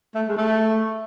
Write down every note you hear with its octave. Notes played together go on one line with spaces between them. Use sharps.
A3
G#3
A3